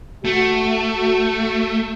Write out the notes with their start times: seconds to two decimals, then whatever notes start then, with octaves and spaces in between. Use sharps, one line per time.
0.25 A3 F#4